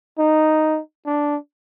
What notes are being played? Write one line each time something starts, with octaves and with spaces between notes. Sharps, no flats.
D#4
D4